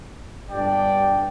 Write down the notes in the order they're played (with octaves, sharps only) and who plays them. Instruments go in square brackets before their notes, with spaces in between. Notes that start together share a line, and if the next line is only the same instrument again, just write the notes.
[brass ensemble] G1 G2 G3 D4 D5 G5